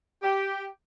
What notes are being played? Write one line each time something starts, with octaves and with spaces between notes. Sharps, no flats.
G4